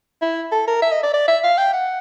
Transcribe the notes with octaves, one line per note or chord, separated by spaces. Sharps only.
E4
A4
A#4
E5
D#5
D5
D5
E5
F5
G5
F#5